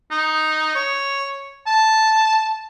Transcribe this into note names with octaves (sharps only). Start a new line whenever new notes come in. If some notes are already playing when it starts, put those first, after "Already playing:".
D#4
C#5
A5